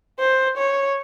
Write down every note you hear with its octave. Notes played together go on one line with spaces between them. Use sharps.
C5
C#5